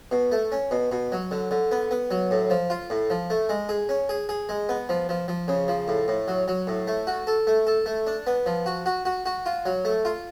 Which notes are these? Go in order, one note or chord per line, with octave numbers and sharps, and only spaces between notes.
B2
A3
C#4
B2
B2
F#3
D3
D3
B3
B3
F#3
A2
F3
F4
A2
F3
A3
G#3
G#4
C#4
G#4
G#4
G#3
B3
F3
F3
F3
C#3
F3
A2
A2
F#3
F#3
A2
A3
F#4
A4
A3
A4
A3
D4
B3
F3
F#4
F#4
F#4
F#4
F4
F#3
A3
F4